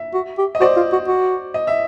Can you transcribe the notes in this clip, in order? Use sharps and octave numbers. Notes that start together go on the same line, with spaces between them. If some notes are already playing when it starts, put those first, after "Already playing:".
Already playing: E5
F#4
G4
D#5
F#4 C5 D5
F4
F#4
F#4
D#5
E5